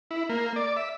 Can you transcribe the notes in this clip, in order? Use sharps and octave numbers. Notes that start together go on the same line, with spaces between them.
E4
A#3
D5
E5